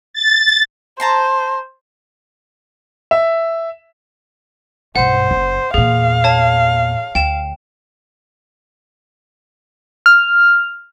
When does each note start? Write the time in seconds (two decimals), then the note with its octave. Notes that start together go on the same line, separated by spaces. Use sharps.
0.14 A6
1.00 C5 A5 A#5 C6
3.11 E5
4.96 B1 G2 C5 F#5
5.31 F#1
5.74 E2 A#2 G#4 F5
6.24 C#5 A5
7.15 D2 G5 E7
10.06 F6